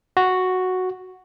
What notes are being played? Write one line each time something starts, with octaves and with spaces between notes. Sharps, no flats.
F#4